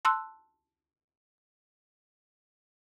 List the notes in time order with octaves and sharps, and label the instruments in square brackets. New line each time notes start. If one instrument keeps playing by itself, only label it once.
[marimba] A5 C6 E6 F#6